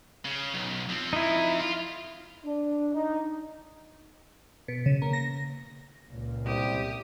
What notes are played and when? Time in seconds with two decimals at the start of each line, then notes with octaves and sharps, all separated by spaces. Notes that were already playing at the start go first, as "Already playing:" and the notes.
0.25 C#3
0.55 B1
0.90 F3 C4
1.13 D#4 E4
1.61 F4
2.44 D4
2.93 D#4
4.68 B2
4.86 C#3
5.02 A#3
5.13 A#6
6.07 C#2 A#2
6.45 C2 G4 D#6